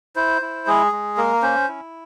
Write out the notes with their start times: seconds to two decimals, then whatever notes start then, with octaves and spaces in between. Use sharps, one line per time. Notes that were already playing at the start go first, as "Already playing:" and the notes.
0.16 E4 C5
0.42 E4
0.67 G#3 G#4
0.92 G#3
1.17 A#3 A#4
1.42 C#4 C5
1.68 E4